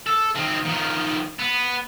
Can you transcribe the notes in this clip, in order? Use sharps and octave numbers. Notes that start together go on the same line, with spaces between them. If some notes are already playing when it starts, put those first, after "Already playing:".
A4
D#3 C4
D#3 F3
B3